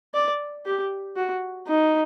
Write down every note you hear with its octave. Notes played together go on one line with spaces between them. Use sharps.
D5
G4
F#4
D#4